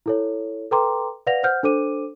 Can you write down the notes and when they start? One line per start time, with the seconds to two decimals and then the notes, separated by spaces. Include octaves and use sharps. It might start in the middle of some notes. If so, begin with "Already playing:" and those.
0.06 E4 A4 C#5
0.71 A4 B4 G5 A#5 C6 D6
1.27 B4 D5 F5 F#5 A#6 F7
1.43 C5 F#5 F6 G6
1.63 D4 A4 C5 D6 D#7